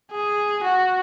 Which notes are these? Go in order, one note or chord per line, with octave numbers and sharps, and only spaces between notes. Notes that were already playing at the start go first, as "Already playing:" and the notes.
G#4
F#4